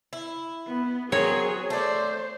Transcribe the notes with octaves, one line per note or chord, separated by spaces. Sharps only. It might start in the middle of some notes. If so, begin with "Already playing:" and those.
E4
B3
F#3 C4 G#4 A#4 C#5
A3 C5 D5